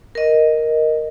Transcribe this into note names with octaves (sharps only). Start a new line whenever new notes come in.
A#4 D#5